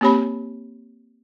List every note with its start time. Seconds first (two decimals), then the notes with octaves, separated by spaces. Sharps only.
0.01 A#3 C4 G4 C#5 B5